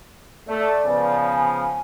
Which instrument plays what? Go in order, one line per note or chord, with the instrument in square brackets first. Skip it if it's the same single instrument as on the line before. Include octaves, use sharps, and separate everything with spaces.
[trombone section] A3 [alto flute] D5
[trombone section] C#3 F3 B3
[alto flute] G#5